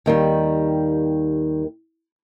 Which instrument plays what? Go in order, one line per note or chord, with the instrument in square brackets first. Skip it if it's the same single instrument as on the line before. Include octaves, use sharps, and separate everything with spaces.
[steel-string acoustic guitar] D#2 D#3 G3